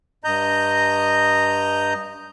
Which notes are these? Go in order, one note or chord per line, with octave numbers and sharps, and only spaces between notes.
G2 D#5 A#5 G6